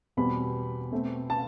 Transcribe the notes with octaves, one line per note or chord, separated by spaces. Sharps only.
E2 B2 G3 C4 B5
B2 A3 C4
A5